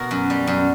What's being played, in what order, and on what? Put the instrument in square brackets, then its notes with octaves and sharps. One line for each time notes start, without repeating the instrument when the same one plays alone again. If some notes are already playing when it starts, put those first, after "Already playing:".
Already playing: [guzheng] B2 F#4 A#4
F#2
G3
F#2